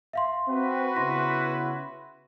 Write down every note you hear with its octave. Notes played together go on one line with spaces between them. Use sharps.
E5 F5 C6
C4 F#4 B4
C#3 B3 E4 C6 A#6